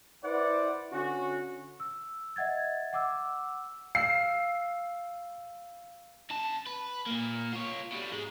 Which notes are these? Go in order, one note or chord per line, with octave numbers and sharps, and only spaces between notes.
E4 B4 C5 D5 F#5
D3 C#4 F#4
E6
D#5 E5 F#5 G#6 A6
F#5 D6 E6
F5 E6 C7
C#3 A5
B4
A#2 A#3
F4 C#5
B2 G3
G#2 G#3